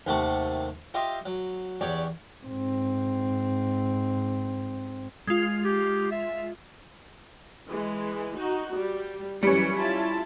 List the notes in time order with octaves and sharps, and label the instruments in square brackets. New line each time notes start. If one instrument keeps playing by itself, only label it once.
[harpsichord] D#2 C3 A3 F#5 A5 C#6
F4 G4 D#5 E5 C6
F#3
E2 G4 C#5 D5
[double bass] G#2 C4
[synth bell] G#3 F4
[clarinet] G4
E5
[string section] E3 G#3
D#4 F#4
G3
[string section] F#2 E3 C#7 [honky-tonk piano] G3 C#4
[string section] E4 F4 A5